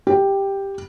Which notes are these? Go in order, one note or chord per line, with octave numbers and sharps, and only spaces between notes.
G4